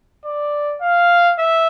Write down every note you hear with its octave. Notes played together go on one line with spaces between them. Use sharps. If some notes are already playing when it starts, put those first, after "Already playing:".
D5
F5
E5